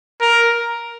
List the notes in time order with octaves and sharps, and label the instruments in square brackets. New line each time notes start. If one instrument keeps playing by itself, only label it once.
[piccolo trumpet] A#4